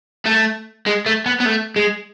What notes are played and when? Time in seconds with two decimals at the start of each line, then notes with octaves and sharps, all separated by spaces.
0.25 A3
0.86 G#3
1.06 A3
1.26 B3
1.40 B3
1.46 A3
1.76 G#3